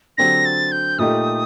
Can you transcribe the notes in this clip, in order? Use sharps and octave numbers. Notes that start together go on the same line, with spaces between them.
D3 F#3 C4 G4 A#6
A6
G6
A#2 A3 D#4 G4 D#6